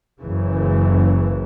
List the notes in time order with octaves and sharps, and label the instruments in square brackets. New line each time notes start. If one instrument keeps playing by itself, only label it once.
[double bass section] F#1 F#2 C#3 E3